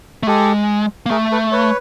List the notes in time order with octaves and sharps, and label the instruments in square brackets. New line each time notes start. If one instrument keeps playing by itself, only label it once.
[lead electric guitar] A3
[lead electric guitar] G#3 [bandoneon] G4 A4
[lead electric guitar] A#3
[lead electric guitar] A3 [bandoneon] G#4 A#4
[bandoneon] A4 B4
B4 C#5